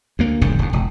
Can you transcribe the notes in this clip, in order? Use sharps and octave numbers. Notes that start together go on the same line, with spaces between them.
D2 A#3
D#1 B1 G#2 D3
D1 D#2
E1